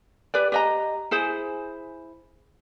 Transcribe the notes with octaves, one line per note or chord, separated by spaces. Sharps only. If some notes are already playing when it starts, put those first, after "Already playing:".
G4 B4 D5
G4 D#5 A#5
E4 G#4 C5